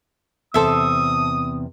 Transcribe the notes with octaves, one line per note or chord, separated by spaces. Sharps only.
E2 C3 A4 C5 E5 D#6